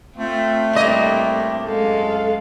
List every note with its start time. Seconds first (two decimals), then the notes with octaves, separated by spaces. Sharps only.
0.17 A3 C4 F4
0.73 A2 G3 A#3 C4 D4 D#5
1.65 F#2 G#3 A4 F5